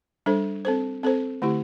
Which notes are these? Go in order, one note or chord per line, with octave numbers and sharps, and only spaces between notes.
G3 D4 A4 C5
C4 A4 C5
C4 A4 C5
D3 A3 E4 G4